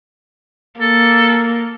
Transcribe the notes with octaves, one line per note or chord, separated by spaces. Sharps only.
A#3 A4